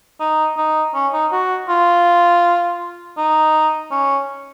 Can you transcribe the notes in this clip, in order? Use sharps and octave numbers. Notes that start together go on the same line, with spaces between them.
D#4
D#4
C#4
D#4
F#4
F4
D#4
C#4